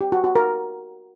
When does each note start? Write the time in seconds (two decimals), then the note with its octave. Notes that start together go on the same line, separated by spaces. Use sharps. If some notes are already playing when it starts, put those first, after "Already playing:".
0.01 G4
0.12 F#4
0.24 F#4
0.35 A#4